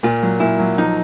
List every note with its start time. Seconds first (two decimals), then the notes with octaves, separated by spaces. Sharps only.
0.03 A#2 F4
0.23 F#3
0.40 A#2 E4
0.59 F#3
0.78 F3 D#4